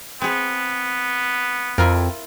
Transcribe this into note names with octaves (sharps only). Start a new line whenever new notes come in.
B3 C4 G#4
F2 E4 F4 A#4